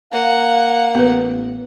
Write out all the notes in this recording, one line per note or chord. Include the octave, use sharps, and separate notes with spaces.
A#3 F5 F#5
A1 B3 B4